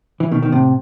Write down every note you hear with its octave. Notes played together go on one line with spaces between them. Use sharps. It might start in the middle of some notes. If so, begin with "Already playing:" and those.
E3
B2 D#3
D#3
A2 C3